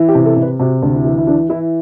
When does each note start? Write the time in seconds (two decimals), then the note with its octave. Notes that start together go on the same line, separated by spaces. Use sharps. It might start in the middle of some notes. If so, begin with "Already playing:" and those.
Already playing: E3
0.08 G4
0.15 C3
0.26 A4
0.36 C3
0.42 B4
0.59 C3 F#4
0.83 D2
0.93 E4
1.05 E3
1.18 E4
1.27 E3 D4
1.49 E3 E4